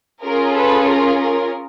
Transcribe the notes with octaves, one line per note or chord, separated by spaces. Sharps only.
C#4 F4 G#4 A#4
A4 B4
A#4
A#4